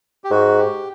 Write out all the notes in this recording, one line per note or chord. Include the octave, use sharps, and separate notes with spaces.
G4
G#2 F#4
G4